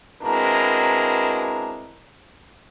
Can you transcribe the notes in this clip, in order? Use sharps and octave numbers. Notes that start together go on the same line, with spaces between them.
B2 G#3 C4 D4 E4 A#4